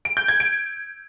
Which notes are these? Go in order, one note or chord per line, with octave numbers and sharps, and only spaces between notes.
D7
G6
G#6
D7